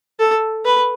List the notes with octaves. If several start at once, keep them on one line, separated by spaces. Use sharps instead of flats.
A4
B4